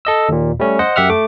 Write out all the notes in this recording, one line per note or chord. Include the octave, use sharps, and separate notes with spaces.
A4 D#5 E6
D#2 A#2
G3 A3 C#4
C5 D#5 F#5
F#2 G4 E5 F#5 F6
A3 D6